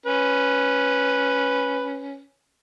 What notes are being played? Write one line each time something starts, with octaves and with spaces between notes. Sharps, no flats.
C#4 B4